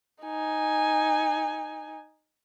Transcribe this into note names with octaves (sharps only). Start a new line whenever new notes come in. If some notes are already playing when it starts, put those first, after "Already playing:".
D#4 G#5